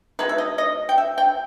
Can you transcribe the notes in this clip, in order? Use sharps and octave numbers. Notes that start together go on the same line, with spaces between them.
B2 G#3 D#4 B4
E5
D#5
D#5
G5
E5
G5